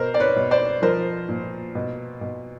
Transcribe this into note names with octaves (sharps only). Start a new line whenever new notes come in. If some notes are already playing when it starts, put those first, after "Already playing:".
Already playing: B2 A#4 C5
D5
B4 C#5
B2
C5 D5
F3 A#4 C5
A#2
B2
B2